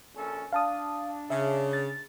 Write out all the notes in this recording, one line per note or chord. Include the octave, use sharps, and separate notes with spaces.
A#1 C#4 A4
D4 F5 A5 D#6
C#3 E5
A6